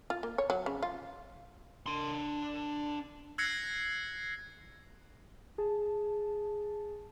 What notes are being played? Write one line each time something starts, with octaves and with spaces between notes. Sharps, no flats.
F4
A#3
C#5
F#3
C#3
F4
D4 C6
E6 F#6 G#6 A#6 C7 C#7
G#4 A5